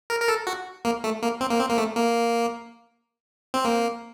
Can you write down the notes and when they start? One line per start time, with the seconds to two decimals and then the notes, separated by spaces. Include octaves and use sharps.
0.10 A#4
0.21 A#4
0.28 A4
0.47 F#4
0.85 A#3
1.04 A3
1.23 A#3
1.41 C4
1.50 A#3
1.60 C4
1.69 A#3
1.78 A3
1.96 A#3
3.54 C4
3.65 A#3